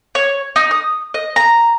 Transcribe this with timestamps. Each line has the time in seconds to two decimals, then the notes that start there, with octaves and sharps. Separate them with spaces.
0.15 C#5
0.56 D#4
0.71 D#6
1.14 D#5
1.36 A#5